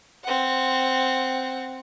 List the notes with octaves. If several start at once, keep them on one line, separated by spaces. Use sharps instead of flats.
C4 F#5